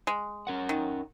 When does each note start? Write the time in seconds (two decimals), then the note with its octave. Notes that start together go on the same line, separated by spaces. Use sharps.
0.07 G#3
0.47 C#4 A#4 F#5
0.69 D#3